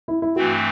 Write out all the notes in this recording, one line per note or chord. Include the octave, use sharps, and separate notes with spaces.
E4
E4
G2 E3 A3 C4 F#4